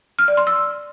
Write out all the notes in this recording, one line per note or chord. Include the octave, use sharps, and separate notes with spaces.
F6
D5
C6
E6